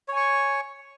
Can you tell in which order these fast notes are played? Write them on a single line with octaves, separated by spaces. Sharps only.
C#5 G#5 C#6